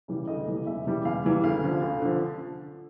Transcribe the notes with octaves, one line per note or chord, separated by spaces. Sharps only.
C#3 E3 G3
D2 D#5
C#3 E3 G3
E2 E5
C#3 E3 G3
E2 F5
C#3 E3 G3
D2 F5
D3 F3
D2
D3 F3